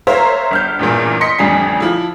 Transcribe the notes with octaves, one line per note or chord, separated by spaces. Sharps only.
A#4 C5 C#5 E5 F5 A#5
G1 F6 G6
A1 E2 G2 A#2
D#5 C6 A#6 B6 C#7
A1 F2 D3 G3 G#5 C7
F3 E4